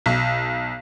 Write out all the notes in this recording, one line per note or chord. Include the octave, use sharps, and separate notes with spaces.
B1